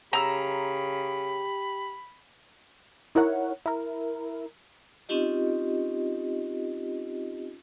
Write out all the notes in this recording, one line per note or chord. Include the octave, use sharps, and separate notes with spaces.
C#3 G4 A#5 B5 E6
D#4 E4 A#4 C#5 F#5
E4 A#4
C4 C#4 D#4 F4 G4 D#5